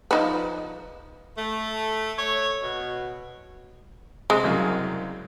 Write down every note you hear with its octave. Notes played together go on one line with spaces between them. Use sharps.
F3 D#4 B4
A3
C#5
B2
C3 G#3
C2 F#2 C#3